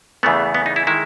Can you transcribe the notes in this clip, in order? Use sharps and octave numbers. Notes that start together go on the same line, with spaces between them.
E2 C#3 E3 A3 B3
B3
D#4
E4
D#3 G#3 E4